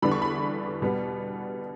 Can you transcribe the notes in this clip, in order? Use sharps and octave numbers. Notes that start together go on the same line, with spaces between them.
E2 D3 G3 B3 D4 B5
C#6
B5
B2 G3 B3